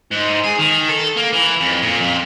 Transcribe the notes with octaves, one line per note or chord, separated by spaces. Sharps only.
G#2
G#4
D#3
A4
A#3
E3
F2
A#2
F2